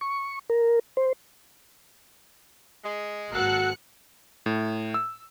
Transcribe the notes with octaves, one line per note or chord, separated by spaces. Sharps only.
C#6
A#4
C5
G#3
G#1 A#3 F#4 A4 F#6 C#7
A2
E6